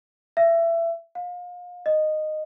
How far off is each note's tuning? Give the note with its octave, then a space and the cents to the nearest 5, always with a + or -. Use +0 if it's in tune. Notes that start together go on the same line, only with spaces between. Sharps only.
E5 +25
F5 +35
D#5 -10